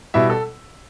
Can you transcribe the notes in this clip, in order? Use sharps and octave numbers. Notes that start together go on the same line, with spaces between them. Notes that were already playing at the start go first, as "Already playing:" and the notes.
B2 G3 E4 E5
A4